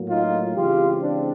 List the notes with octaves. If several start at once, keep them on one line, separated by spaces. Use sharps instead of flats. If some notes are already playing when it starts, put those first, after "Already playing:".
Already playing: A2 F#3 A#3
D#4 F4
C#3 E3 G#3 C4 F4 G4
C4 D4